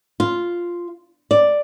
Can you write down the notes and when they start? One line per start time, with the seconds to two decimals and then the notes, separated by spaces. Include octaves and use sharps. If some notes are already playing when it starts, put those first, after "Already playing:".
0.20 F4
1.31 D5